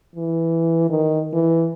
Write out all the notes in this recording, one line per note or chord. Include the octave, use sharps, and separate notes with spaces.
E3
D#3
E3